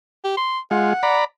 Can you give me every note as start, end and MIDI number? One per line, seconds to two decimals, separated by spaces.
0.24 0.37 67
0.37 0.59 84
0.71 0.93 56
0.71 0.93 65
0.71 1.19 78
1.03 1.24 74
1.03 1.24 82
1.03 1.24 83